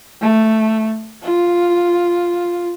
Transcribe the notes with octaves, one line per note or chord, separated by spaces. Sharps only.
A3
F4